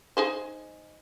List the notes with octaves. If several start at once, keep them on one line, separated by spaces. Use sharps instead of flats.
D#4 G#4 C5